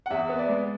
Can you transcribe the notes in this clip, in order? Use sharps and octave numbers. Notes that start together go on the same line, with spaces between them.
F#5
E2 E5
B3
D5
G#3